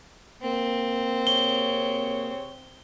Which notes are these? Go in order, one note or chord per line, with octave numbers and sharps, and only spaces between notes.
A#3 C4
C3 G#4 C#5 G7